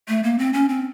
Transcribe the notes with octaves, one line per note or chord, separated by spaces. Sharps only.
A3
A#3
C4
C#4
C4